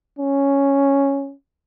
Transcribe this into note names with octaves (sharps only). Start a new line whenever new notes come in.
C#4